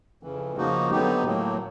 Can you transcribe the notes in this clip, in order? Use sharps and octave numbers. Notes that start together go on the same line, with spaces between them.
F2 C#3 E3
C#3 F3 A#3 D#4 F#4
D3 F#3 B3 D#4 G4
A2 F#3 A#3